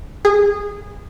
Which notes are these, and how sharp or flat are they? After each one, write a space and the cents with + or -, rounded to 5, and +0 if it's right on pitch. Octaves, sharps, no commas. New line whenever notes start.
G#4 -20